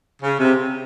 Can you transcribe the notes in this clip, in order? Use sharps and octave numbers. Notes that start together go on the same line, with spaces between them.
C#3
C3